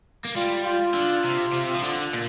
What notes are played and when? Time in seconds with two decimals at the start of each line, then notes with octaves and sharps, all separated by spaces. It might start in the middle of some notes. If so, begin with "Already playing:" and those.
0.25 A#3
0.36 G3 F4
0.65 F4
0.94 D3
1.25 C3
1.53 C3
1.74 F3
1.83 D3
2.13 A#2